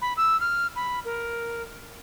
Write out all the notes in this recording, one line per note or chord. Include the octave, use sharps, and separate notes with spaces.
B5
E6
F6
B5
A#4